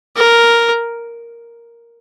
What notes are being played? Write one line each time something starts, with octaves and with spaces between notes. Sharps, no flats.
A#4